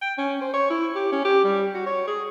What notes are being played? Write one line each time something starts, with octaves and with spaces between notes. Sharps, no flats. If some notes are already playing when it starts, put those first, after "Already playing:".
G5
C#4
C5
C#5
E4
G4
C#4
G4
G3
F#4
C#5
G#4